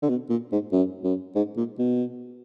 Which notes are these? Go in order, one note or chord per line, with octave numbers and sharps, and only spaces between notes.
D3
B2
A#2
G#2
F#2
F#2
G#2
A#2
B2